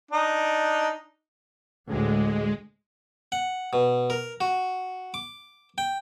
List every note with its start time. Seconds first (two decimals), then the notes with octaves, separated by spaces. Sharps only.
0.11 D4 D#4
1.88 D2 A2 G#3
3.32 F#5
3.73 B2
4.10 A#4
4.41 F#4
5.14 D6
5.78 G5